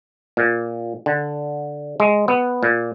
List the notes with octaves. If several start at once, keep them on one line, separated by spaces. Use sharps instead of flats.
A#2
D3
G#3
B3
A#2